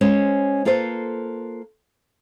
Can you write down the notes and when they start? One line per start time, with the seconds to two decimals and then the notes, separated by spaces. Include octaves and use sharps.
0.01 G#3 C#4 C5 C#5
0.65 A#3 F4 A4 B4 C5